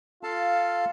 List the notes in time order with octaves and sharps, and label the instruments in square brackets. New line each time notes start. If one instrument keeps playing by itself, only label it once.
[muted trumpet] F4 [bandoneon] A4 F5 A5